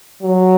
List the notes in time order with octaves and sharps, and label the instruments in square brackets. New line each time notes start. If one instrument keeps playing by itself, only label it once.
[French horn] F#3